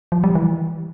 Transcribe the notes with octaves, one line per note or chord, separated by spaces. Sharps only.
F3
G3
E3